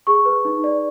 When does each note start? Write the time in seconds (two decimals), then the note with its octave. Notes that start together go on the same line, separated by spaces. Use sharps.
0.07 G#4 C#6
0.25 B4
0.45 D#4
0.64 D5